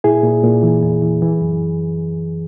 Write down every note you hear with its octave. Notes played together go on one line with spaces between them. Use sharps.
A#2 E4 G#4
A#2
A#2
E3
E2
E3
E3
F#2